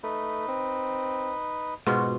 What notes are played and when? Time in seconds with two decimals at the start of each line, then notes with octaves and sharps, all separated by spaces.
0.03 A3 D#4 B4
0.48 C4
1.86 G#2 B2 F4 F#4